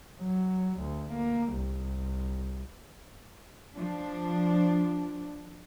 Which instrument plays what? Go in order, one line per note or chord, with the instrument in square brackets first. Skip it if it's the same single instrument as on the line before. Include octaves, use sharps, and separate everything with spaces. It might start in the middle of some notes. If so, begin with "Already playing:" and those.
[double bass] F#3
D2
A#3
C2
[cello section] F3 D4